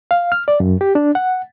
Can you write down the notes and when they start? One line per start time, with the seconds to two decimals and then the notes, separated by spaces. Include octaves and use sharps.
0.11 F5
0.32 F6
0.48 D5
0.60 F#2
0.81 G4
0.95 D4
1.15 F#5